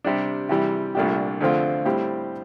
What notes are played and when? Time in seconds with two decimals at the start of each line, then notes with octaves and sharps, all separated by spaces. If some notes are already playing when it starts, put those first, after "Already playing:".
0.05 C3 G3 D4
0.49 C3 E3 G3
0.95 C2 A#2 A3 D4 G4
1.41 D2 D3 F3 C4 F4
1.85 A2 G3 C4 G4